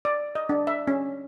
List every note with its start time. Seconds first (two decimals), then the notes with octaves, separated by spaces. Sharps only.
0.05 D5
0.35 D#5
0.49 D4
0.67 E5
0.87 C#4